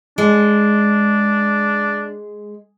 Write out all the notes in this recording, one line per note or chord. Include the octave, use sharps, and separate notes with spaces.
G#3 D4